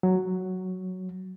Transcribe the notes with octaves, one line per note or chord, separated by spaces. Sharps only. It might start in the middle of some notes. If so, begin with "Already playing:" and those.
F#3